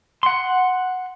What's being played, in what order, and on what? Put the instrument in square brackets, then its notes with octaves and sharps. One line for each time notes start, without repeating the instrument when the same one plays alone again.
[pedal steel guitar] F#5 C6